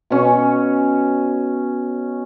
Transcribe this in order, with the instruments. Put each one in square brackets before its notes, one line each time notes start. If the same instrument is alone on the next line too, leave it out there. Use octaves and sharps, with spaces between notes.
[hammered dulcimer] B2 C#4 C#6